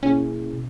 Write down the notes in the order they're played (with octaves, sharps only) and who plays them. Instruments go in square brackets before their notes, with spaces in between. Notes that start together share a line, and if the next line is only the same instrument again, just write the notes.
[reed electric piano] B2 A#3 E4 G#4 [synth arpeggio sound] C#4
[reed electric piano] B2